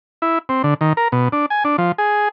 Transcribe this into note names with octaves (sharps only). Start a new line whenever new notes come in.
E4
C4
D3
D#3
A#4
B2
D4
G#5
D4
F3
G#4